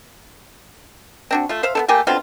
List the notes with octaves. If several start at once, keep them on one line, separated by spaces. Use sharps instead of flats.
C4 D4 F#4
A3 F4
C5 E5 F5
B3 C4 A4
A3 A#3 G4 G#5
B2 D3 C4 F4